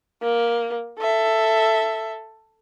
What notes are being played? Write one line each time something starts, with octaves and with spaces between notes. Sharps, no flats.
A#3
A4 E5